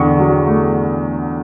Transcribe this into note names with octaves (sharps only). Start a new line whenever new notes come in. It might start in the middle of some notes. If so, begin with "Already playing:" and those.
Already playing: E2 D3 C#6
F#3
A3